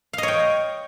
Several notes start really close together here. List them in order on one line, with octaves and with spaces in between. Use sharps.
F5 D#5 C#5 G5